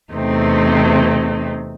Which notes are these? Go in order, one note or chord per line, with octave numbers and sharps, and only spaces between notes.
E2 C3 A3 C4 D#4